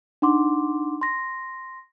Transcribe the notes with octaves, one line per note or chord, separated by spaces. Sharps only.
D4 D#4 F#5 C6 D6
C6 A#6